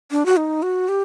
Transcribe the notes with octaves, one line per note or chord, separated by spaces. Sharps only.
D4
F#4
D#4
F#4
G4